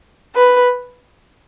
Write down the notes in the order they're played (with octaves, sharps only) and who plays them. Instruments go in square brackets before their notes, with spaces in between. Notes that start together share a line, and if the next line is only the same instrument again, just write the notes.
[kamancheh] B4